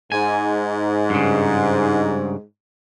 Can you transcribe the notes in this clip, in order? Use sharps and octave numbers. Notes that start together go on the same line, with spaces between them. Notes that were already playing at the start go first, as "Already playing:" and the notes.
G#2 G#5
G2 C#3